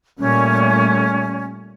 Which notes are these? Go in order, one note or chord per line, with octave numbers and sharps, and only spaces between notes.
A#2 G3 A3 C#4